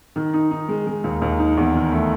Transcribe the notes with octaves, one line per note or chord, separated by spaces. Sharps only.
D#3
D#4
D#4
G#3
G#3
D#2
D#2
D#4
E2
D#3
A3